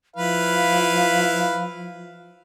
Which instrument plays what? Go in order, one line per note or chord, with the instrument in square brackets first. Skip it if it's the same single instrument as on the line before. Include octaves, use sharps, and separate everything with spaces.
[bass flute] F3 [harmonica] E4 B4 F5